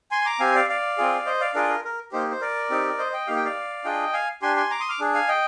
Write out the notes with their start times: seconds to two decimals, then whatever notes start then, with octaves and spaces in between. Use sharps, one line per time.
0.11 G#5 C6
0.21 C6
0.25 A#5 D6
0.40 C4 G4 F5 G#5
0.55 D5 F5
0.69 D5 F5
0.98 C4 F4 G#4
1.26 C5 D#5
1.41 D5 F5
1.54 D4 F4 G#4 A#4 D5
1.69 A#4
1.84 A#4
2.12 A#3 D#4 G4 C5
2.31 C5
2.41 A#4 D5
2.70 C4 D#4 G4
2.98 C5 D#5
3.12 D#5 G5
3.27 A#3 D#4 G4 F5
3.36 G5
3.45 D5 F5
3.84 D4 F4 G#4 D#5 G5
4.13 F5 G#5
4.42 D4 G4 G#5 C6
4.56 G#5 C6
4.70 A#5 D6
4.80 C6 D#6
4.89 D6 F6
4.99 D4 G#4
5.14 F5 G#5
5.28 D#5 G5